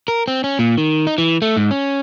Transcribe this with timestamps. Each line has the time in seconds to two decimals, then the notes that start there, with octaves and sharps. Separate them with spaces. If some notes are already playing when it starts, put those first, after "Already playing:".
0.08 A#4
0.28 C4
0.44 C#4
0.59 A#2
0.78 D#3
1.07 D#4
1.18 E3
1.42 A3
1.57 G#2
1.71 C#4